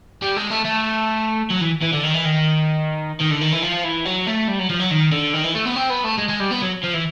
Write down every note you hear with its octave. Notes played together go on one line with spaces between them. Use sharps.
G3
G#3
A3
A3
F#3
E3
E3
D3
D#3
E3
D#3
D#3
D3
D#3
E3
F3
E3
F#3
A3
G3
F#3
F3
F#3
D#3
D3
D#3
E3
A3
B3
C4
B3
A3
G#3
G#3
G3
B3
F#3
F3
E3